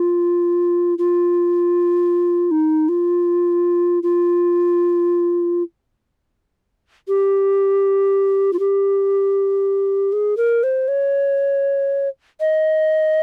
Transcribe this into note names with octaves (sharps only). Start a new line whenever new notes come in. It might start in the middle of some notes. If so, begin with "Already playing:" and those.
Already playing: F4
F4
D#4
F4
F4
G4
F4
G4
G#4
A#4
C5
C#5
D#5